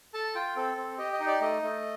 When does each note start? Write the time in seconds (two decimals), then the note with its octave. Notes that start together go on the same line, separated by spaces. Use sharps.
0.14 A4 A5
0.35 F4 G5
0.56 C4 A4
0.77 C4
0.98 G4 D#5
1.13 D#5
1.20 D#4
1.27 D5
1.41 A3 D#5
1.63 A3